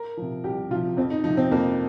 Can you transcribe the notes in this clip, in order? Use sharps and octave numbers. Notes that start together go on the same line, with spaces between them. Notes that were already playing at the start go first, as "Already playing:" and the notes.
Already playing: A#4
C3 F3
C2 G4
C3 F3 F4
F2 C4
D#4
C3 F3 D#4
C4
F2 A#3